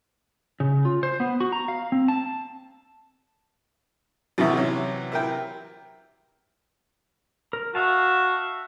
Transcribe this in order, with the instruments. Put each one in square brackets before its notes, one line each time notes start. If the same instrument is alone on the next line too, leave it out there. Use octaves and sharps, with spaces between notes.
[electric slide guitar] C#3
F4
C5
B3
F#4
A#5
F5
C4
A5
[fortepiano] B1 D#3 E5 [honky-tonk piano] C3 E3 F#3
[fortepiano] C#4 E4
E4 A#4 G5
[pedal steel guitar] A#4
[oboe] F#4 [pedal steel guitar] E5 F5 A5